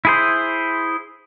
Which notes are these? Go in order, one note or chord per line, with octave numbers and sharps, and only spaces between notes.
E4 G#4 C5